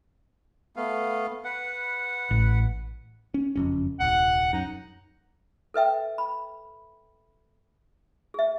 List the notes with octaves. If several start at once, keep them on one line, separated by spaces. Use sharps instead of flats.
A3 B3 F5
B4 F#5
A1
C#4
F#1 F2 C#4
D#1 C2 F#5
F#2 D#4
A4 B4 E5 G5
B5
G#4 E5